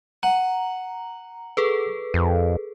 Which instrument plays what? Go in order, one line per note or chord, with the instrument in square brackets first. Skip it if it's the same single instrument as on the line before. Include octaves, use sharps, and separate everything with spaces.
[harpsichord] F#5 [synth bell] A#5
[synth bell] G#4 A4 B4
[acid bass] F2